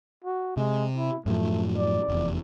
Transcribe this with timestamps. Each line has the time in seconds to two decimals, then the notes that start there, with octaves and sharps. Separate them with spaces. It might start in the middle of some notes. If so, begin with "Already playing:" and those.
0.24 F#4
0.57 C3 G#3
0.96 E4
1.26 F#2 A2 F3 A3
1.77 D5
2.09 F1 E2